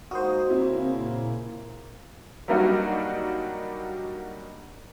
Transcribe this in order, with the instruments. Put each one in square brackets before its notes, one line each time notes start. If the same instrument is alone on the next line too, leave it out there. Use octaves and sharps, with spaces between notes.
[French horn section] G#3 A#3 D#4 [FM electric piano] F#4 C5 [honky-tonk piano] D#6
[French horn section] C#3 A#3 [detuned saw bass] C4 [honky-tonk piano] E4
[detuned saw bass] A#2
[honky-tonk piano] F#3 G3 A#3 D4 D#4 F#4